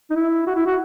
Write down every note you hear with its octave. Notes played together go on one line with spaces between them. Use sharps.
D#4
E4
F#4
E4
F#4